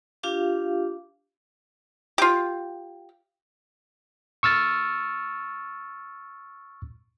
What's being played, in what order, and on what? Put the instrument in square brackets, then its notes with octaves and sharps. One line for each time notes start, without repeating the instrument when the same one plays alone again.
[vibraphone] D4 F4 G4 F5 D6
[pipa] F4 G4
[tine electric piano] C#6 E6 F6 A6